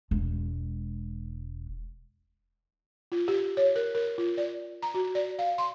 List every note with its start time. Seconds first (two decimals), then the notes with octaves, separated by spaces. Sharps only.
0.11 E1 G#3
3.12 F4
3.28 G4
3.57 C#5
3.76 A#4
3.95 A#4
4.18 F4
4.38 D5
4.82 A#5
4.94 F#4
5.15 D5
5.39 F5
5.58 C6